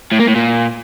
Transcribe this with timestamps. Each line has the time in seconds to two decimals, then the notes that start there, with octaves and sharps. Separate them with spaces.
0.12 A2
0.20 A#3
0.28 A2
0.36 A#2